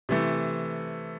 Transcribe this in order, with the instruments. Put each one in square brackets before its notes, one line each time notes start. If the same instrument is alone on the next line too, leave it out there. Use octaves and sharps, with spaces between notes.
[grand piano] C3 E3 A3